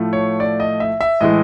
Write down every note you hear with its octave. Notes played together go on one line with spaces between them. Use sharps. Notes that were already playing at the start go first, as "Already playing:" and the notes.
Already playing: A2 F3 A3
C#5
D5
D#5
E5
E5
A2 E3 G#3 D#5